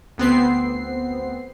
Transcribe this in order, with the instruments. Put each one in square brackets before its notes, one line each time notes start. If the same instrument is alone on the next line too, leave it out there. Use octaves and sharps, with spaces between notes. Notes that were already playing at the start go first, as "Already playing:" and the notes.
[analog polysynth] D2 B3 C4 C7